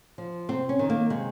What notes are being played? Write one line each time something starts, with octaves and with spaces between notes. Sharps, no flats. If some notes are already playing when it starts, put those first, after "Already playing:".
F3
C3 C4
C#4
D#3
A#3
C3 G#3